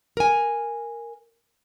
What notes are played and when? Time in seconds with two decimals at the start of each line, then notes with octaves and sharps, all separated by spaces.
0.17 A#4 G#5